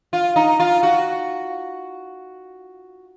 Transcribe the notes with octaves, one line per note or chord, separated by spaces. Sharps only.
F4
D#4
F4
F#4